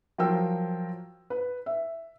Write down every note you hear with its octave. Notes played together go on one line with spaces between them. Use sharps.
F3 F#3 F4 A#4 G5 E6
B4
E5